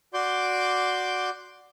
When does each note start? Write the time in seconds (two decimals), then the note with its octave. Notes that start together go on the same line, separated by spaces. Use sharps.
0.14 F#4 D5 C6 D6 G6